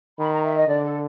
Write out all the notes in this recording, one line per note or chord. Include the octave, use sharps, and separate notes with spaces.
D#3 B5
A#5
E5
D#5
D3 D5
A4